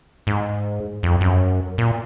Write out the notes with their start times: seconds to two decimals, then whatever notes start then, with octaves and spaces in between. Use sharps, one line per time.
0.27 G#2
1.03 F2
1.21 F#2
1.78 A#2